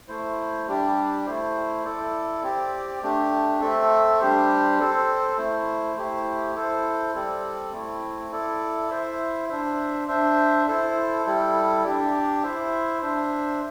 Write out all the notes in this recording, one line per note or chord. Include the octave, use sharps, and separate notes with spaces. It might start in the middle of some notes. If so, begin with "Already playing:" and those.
A3 E4 C5
G3 D4 G4 D5
A3 E4 C5
E4 A4 D5
C4 G4 D5
A3 D4 G4
A3 C4 A4 E5
G3 D4 G4 C5
C4 A4 C5
A3 E4 C5
A3 E4 G4 C5
E4 A4 C5
G3 C4 A4 D5
A3 C4 E4
E4 A4 D5
E4 C5 E5
D4 C5 E5
D4 C5 E5
E4 A4 C5
G3 E4 A4
D4 G4 D5
E4 C5 E5
D4 C5 E5